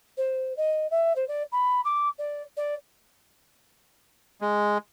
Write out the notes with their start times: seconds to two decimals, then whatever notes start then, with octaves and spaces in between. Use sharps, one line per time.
0.17 C5
0.57 D#5
0.91 E5
1.16 C5
1.28 D5
1.52 B5
1.85 D6
2.18 D5
2.57 D5
4.41 G#3